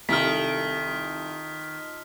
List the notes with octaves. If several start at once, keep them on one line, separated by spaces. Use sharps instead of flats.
C2 D#3 F4 A4 F6 B6